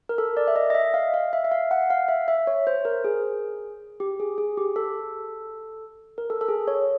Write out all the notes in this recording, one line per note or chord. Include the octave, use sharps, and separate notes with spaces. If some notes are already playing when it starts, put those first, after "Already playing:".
A#4
A4
D5
E5
D#5
D#5
E5
F5
F5
E5
E5
F5
F#5
F5
E5
E5
C#5
C5
A#4
G#4
G4
G#4
G#4
G4
A4
A#4
A4
A4
G#4
C#5